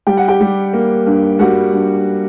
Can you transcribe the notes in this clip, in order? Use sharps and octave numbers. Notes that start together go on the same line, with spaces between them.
G3 G5
F#5
G4 G5
G3
A#3
G2
G3 F#4 F#5
G2